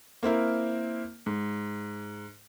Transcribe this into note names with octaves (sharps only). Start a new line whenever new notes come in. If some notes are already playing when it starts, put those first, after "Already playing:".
A#3 C4 E4 A#4
G#2